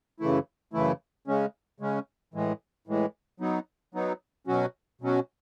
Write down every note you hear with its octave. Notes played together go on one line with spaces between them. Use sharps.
F#2 C#3 E3 A3 E4
F#2 C#3 E3 A3 E4
C#3 G#3 C#4
C#3 G#3 C#4
A2 E3 G#3
A2 E3 G#3
F#3 B3 D#4
F#3 B3 D#4
B2 F#3 C#4 F#4
B2 F#3 C#4 F#4